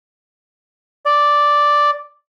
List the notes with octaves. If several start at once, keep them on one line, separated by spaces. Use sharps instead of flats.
D5